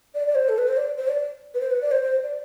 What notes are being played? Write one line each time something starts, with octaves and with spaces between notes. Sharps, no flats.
D5
D5
C5
A4
B4
C5
D5
C5
D5
B4
C5
B4
D5
C5
C5
D5